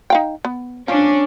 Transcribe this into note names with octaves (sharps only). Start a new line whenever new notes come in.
D#4 F5 G5
B3
F3 C#4 D4